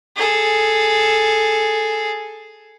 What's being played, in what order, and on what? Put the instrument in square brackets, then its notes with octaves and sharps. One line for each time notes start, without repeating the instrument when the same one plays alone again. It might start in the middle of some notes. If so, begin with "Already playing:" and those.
[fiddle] G#4 A4